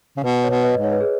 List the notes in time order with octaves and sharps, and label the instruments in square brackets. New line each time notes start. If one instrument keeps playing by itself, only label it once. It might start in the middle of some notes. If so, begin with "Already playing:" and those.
[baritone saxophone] C#3
[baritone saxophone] B2 [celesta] B4
[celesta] C#5
[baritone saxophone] B2
[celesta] B4 D#5
[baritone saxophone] G#2
[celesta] C#5
B4
G#4